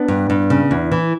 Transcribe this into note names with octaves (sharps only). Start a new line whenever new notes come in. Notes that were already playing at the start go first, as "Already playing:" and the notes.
Already playing: B3 D4
G2
G2
C#3
E2
E3